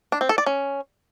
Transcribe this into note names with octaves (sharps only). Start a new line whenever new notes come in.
D4
C4
A4
D5
C#4